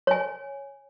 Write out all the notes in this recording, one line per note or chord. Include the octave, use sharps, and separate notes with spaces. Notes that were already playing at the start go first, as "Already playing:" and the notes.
C#5 G#5